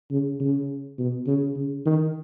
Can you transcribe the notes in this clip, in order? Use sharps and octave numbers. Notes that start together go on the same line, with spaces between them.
C#3
C#3
B2
C#3
C#3
D#3